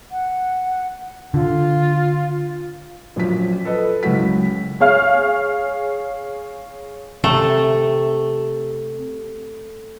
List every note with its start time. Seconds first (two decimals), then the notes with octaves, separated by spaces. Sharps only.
0.11 F#5
1.34 D3 F4
3.16 A#1 F#2 F3 B6
3.65 A4 B4 D#5
4.03 C#2 F#2 G#3 E4 F#4 B6
4.80 G#4 C#5 F5 F6
7.24 C3 A3